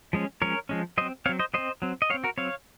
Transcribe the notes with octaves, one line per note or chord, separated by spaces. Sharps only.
F3 G#3 C#4
F3 G#3 C#4 A#4 C#5
F3 G#3 C#4
F#3 C4 C5 D#5
F#3 C4 C#5 F5
C5 D#5
F#3 C4 C5 D#5
F#3 C4
D#5
F#3 C#5 F5
C4
F#4 A#4
F#3 C4 C#5 F5